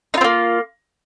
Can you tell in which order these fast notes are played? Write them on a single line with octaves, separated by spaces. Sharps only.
D#4 F4 C4 A#3